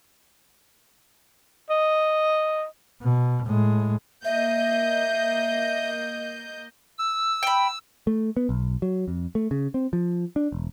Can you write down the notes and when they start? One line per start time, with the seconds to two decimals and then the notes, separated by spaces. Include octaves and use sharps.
1.70 D#5
3.02 B2
3.46 A2 G#3
4.25 A#3 D#5 E5 G6
6.98 E6
7.43 G5 B5
8.07 A3
8.37 B3
8.49 B1
8.82 F#3
9.08 F2
9.35 A3
9.51 C#3
9.74 C4
9.93 F3
10.36 D4
10.52 E1